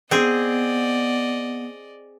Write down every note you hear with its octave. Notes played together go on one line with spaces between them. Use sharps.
B3 C4 G#4 D5 D#5